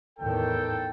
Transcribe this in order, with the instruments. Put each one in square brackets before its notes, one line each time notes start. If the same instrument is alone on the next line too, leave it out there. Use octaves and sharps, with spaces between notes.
[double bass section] E2 A2 D#3 [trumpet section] A4 G5